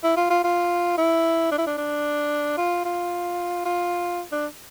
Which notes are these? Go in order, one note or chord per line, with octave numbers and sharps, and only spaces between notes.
E4
F4
F4
F4
E4
D4
E4
D4
D4
F4
F4
F4
D4